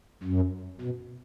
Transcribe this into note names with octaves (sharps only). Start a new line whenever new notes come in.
F#2
B2